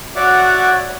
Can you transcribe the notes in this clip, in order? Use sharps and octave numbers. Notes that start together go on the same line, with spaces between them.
F#4 C#5 D5 E5 F#5 D6